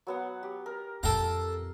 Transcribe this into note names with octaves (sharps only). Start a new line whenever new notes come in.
F#3 B3 F#5
G4
A#4
F2 A4 F5 G5 A#5